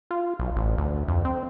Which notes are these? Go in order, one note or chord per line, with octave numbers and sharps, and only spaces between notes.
F4
B1
A1
D2
F2
C4